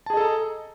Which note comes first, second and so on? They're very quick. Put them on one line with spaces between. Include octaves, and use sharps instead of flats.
A5 G#4 D#5 A4 A#5